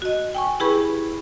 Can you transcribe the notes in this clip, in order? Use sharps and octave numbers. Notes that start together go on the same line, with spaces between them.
F#4 D#5
G5 G#5 C#6
E4 G4 G#4 B4 B5 C#6